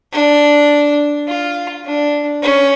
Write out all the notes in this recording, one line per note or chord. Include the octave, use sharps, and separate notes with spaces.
D4
F4
D4
C#4